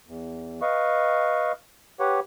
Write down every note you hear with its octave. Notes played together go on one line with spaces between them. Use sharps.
E2
B4 D#5 F5 C#6
G4 B4 C#5 F#5